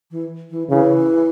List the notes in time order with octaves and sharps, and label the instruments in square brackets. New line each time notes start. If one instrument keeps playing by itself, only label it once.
[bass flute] E3
E3
[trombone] C#3 [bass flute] E3